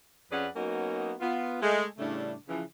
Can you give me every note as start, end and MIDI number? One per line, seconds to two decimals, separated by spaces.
0.31 0.47 41
0.31 0.47 61
0.31 0.47 68
0.31 0.47 71
0.31 0.47 74
0.31 0.47 78
0.55 1.13 54
0.55 1.13 58
0.55 1.13 59
0.55 1.13 61
0.55 1.13 63
0.55 1.13 66
1.20 1.57 59
1.20 1.57 65
1.62 1.85 56
1.62 1.85 57
1.98 2.33 45
1.98 2.33 49
1.98 2.33 55
1.98 2.33 57
1.98 2.33 62
2.48 2.62 49
2.48 2.62 52
2.48 2.62 53